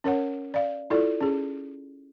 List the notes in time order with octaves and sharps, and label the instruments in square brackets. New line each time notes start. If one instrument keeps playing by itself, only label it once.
[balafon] C#4 A#4 C#5 F#5
D5 F5
E4 F4 A4 D5
C#4 G#4